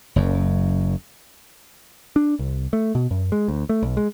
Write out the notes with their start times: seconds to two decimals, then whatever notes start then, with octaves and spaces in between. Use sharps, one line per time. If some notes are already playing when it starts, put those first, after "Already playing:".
0.16 F#1 F#2
2.16 D4
2.39 C2
2.73 A3
2.95 B2
3.11 F#2
3.32 G#3
3.48 D2
3.69 A3
3.83 B1
3.97 G#3